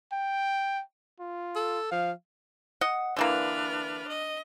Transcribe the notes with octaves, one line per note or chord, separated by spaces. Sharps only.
G5
F4
A4
F3 F5
D#5 F#5
D3 E3 A#3 D4 B4 F6
D#5